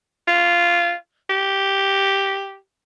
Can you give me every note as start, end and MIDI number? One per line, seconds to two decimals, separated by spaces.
0.28 0.93 65
1.30 2.56 67